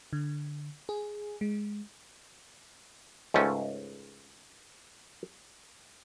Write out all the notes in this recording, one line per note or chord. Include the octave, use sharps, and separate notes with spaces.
D3
G#4
G#3
C#2 G#2 A3 C#4